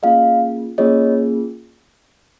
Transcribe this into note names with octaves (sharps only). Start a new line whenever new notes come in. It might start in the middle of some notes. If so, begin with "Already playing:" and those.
A#3 C#4 F4 G#4 D#5 F5
A#3 C#4 F4 G#4 C#5 D#5